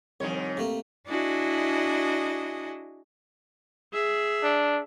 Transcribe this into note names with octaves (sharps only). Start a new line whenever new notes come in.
C2 F2 D#3 C#5
C3 A3 A#3
D4 E4 F#4 G#4 D#5
G#4 E5
D4